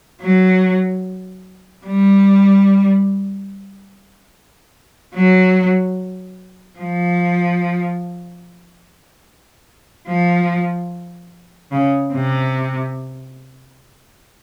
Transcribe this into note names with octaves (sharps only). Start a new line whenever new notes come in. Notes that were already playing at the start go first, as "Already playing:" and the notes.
F#3
G3
F#3
F3
F3
C#3
C3